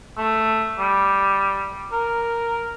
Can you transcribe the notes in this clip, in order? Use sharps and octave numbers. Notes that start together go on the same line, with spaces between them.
A3
G3
A#4